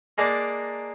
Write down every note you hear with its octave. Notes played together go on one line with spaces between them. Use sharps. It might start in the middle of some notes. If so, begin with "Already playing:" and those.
G#3 A#3 D4 A5 A#5 D6